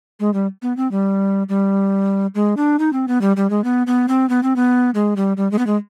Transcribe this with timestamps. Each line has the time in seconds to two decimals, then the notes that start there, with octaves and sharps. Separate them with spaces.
0.20 G#3
0.33 G3
0.62 B3
0.77 C4
0.91 G3
1.49 G3
2.35 G#3
2.57 D4
2.79 D#4
2.93 C4
3.08 B3
3.21 G3
3.36 G3
3.50 G#3
3.64 B3
3.87 B3
4.08 C4
4.29 B3
4.43 C4
4.56 B3
4.94 G#3
5.16 G3
5.37 G3
5.51 G#3
5.58 B3
5.67 G#3